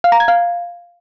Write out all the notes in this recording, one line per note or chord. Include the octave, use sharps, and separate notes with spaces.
F5
A#5
G#6
F5